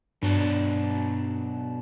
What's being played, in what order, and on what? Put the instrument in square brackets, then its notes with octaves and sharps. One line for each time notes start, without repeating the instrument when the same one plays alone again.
[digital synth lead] G2 [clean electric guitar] B2 F#3 D4